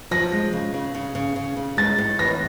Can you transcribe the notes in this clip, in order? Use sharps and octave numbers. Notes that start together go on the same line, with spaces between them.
F3 A#6
G#3
C#3
C#3
C#3
C#3
C#3
C#3
G#3 A6
A2
E3 A#6